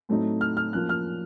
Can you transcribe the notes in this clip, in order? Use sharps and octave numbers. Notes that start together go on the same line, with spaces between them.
A2 F#3 A3 C4 D#4
F6
F6
F#2 F3 A#3 F#6
F6